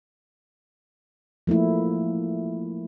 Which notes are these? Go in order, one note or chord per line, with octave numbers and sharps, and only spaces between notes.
F3 A3 A#3 E4